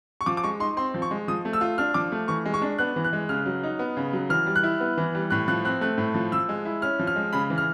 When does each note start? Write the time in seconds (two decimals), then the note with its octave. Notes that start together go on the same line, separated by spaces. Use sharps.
0.21 C#6
0.26 F3 D6
0.37 D6
0.44 G#3 C#6
0.60 D#4 C6
0.77 C4 C6
0.94 F3
1.02 C#6
1.11 G#3
1.28 F3 D#6
1.45 A3
1.53 E6
1.61 F4
1.78 D4 F6
1.94 F3 D6
2.12 A3
2.28 E3 C#6
2.45 G#3
2.54 C#6
2.62 D4
2.78 B3 F#6
2.96 E3
3.04 F#6
3.13 G#3
3.29 C#3 F6
3.46 F#3
3.63 D#4
3.79 B3
3.97 C#3
4.13 F#3
4.30 E3 F6
4.46 G3
4.56 F#6
4.63 E4
4.80 B3
4.98 E3
5.15 G3
5.30 A2 F#6
5.48 F3 F#6
5.64 C4 F#6
5.81 A3 F#6
5.98 A2
6.15 F3
6.32 F3 E6
6.49 G#3
6.65 E4
6.82 C#4 F6
6.99 F3
7.07 F6
7.16 G#3
7.33 C#3 B5
7.50 E3
7.58 F6